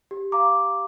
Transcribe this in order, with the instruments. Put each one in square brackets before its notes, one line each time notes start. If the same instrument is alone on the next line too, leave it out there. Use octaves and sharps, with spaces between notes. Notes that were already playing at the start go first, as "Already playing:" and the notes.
[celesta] G4
F5 A#5 D6